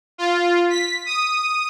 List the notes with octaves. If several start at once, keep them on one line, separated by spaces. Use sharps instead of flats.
F4
B6
D#6